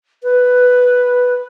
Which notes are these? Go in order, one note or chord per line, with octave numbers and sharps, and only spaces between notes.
B4